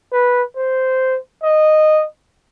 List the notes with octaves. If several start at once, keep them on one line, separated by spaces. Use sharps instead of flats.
B4
C5
D#5